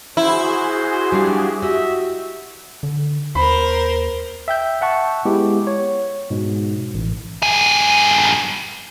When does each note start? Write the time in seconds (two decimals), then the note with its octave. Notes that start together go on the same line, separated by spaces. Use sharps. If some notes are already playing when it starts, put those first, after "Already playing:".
0.17 E4 F#4 G#4 C5
1.12 G3 D4 G4 F5
1.62 F#4 G4 D#5 E5
2.83 D3
3.35 D#2 A#4 C5 B5
4.48 E5 G5 G6
4.81 E5 F#5 A5 C#6
5.25 G#3 B3 E4 G4
5.67 C#5
6.30 G#2 B2
6.94 A1
7.43 G2 G#4